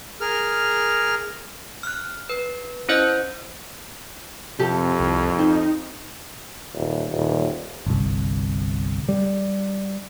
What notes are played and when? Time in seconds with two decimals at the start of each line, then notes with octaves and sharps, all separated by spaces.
0.21 G#4 A#4 F6
1.83 F6 F#6
2.29 B4
2.89 C#4 E4 C5 D#5 G6
4.59 F2 C3 G4 A4
5.00 C2
5.39 C4 D#4
6.74 D#1
7.11 D#1
7.86 G1 C2
9.09 G3